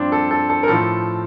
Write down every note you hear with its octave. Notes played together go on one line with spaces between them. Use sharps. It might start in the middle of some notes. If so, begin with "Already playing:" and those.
Already playing: G2 F3 C4 D4
A4
A4
A4
A#4
A2 F3 A4